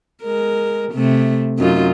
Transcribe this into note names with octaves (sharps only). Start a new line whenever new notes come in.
G#3 A#4
C3 A3
F#2 D#4 F4